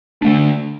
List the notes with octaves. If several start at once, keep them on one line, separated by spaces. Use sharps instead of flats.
D3 A3 D4